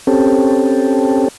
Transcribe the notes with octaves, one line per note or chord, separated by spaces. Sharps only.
C4 C#4 G4 A4